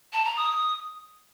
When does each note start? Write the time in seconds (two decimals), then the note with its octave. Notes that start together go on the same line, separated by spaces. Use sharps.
0.13 A5
0.25 A#5
0.36 D#6